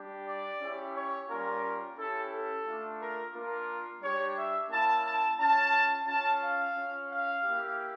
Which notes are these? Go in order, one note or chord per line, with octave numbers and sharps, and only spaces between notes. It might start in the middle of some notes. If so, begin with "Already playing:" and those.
Already playing: G3 D4 G4
D5
C#4 E4 G4
C#5
G3 A#3 C#4 F4 A#4
C#4 E4 G4 A4
A4
A3 D4 F4
A#4
A#3 D4 F4 A#4
G3 D4 G4 C#5
E5
A#3 C#4 E4 A5
A5
C#4 F4 A5
C#4 F4 A5
F5
C#4 F4
F5
A#3 E4 G4